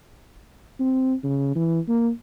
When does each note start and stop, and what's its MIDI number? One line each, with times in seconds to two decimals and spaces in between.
0.80 1.14 60
1.23 1.51 49
1.55 1.79 52
1.88 2.10 58